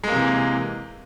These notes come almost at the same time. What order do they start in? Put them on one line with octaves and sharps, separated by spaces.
G#3 A#3 C3 E3